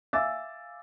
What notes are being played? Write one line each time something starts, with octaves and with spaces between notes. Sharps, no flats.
E5 F5 G#5 D6 E6 A6